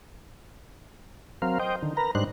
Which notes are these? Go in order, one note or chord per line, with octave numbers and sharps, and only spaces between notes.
F#3 C4 A#4 F5
C5 D#5 G5
D3 D#3
A#4 B4 A#5
G#2 G3 D4 D#4 C5 F#6